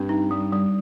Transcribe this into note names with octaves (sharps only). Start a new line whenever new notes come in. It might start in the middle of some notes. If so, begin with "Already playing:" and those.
Already playing: G2 C4
D#4
G3
G3